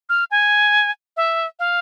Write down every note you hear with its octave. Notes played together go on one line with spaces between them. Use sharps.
F6
G#5
E5
F5